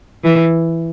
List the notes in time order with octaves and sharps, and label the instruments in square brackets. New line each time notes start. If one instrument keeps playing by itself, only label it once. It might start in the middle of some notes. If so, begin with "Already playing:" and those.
[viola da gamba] E3